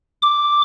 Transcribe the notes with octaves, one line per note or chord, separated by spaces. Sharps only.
D6